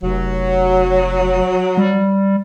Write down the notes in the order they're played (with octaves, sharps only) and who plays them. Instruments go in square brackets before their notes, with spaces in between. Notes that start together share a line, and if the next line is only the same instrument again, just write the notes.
[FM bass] F1 [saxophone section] F#3
[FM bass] G3